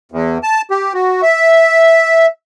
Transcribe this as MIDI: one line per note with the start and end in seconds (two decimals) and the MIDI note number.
0.12 0.38 40
0.43 0.62 81
0.71 0.93 67
0.94 1.22 66
1.22 2.26 76